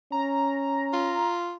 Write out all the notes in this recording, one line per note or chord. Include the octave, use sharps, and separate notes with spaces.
C#4 A#5
F4